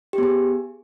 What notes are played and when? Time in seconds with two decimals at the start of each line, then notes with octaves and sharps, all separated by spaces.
0.13 G4
0.18 B3
0.23 G#4